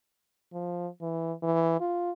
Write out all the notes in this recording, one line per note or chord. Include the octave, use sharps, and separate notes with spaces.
F3
E3
E3
F4